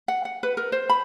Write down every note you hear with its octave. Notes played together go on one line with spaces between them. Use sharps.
F#5
F#5
B4
A#4
C5
B5